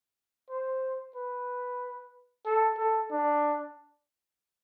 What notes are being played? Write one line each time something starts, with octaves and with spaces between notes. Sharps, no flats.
C5
B4
A4
A4
D4